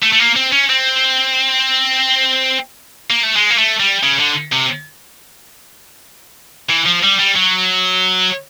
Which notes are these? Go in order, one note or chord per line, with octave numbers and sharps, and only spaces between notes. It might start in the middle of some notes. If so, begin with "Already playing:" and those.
A3
A3
A#3
C4
C#4
C4
A#3
A3
G#3
A#3
A3
G3
C#3
D3
C3
E3
F3
G3
G3
F#3